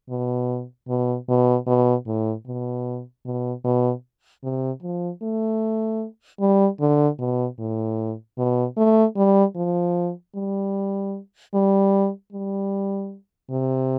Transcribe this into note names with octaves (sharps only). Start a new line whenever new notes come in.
B2
B2
B2
B2
A2
B2
B2
B2
C3
F3
A3
G3
D3
B2
A2
B2
A3
G3
F3
G3
G3
G3
C3